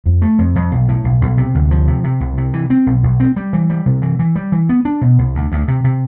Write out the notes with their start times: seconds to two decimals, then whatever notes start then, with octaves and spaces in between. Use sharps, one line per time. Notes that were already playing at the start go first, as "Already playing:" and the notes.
0.06 F2
0.22 A3
0.39 F2
0.55 F2
0.72 B1
0.88 A2
1.04 B1
1.21 B1
1.38 C3
1.55 D2
1.71 F3
1.87 C3
2.04 C3
2.20 C2
2.37 C3
2.53 E3
2.70 C4
2.86 B1
3.03 B1
3.20 C4
3.36 G3
3.53 E3
3.70 G3
3.86 C3
4.02 E3
4.19 E3
4.36 G3
4.52 E3
4.69 B3
4.85 D4
5.01 B2
5.19 C2
5.35 D2
5.52 D2
5.68 C3
5.84 C3